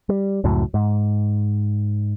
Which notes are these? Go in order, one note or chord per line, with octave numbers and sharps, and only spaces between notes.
G3
C#2 F#2 A2 F#3
G#2